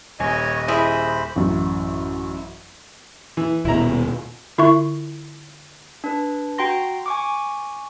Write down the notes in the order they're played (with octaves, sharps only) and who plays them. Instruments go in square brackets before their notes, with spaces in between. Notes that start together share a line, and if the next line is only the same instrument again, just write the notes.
[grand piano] D#1 G#5 [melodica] C#5 [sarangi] D#5
[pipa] E4 G#4 [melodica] C5 B5
[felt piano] A1 F#2
[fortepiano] E3
[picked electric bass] D#1 B2 [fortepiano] E4 A#5
[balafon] D3 E4 F4 E5 C#6
[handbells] D4 B4
F#4 G5 A#5 C6 A#6
G#5 C#6 D6